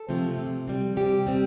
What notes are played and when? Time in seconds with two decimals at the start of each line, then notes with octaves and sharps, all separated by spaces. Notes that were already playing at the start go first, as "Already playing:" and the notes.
Already playing: A4
0.09 C3 F3 A3 C4
0.38 C3
0.68 G3 C4
0.96 C3 G3 G4
1.27 G3 C4